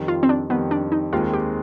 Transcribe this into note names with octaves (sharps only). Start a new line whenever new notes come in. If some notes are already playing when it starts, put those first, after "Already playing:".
Already playing: F2 D#3 G3
F4
C4
D4
F2 D#3 G3 B3
D4
D#4
D#2 D#3 G#3 C4 F4
G4